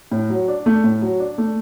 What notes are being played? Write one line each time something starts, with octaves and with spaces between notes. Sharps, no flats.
A2
F#3
D4
A3
A2
F#3
D4
A3